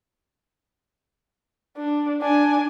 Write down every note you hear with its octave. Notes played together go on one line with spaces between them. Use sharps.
D4
D4 G#5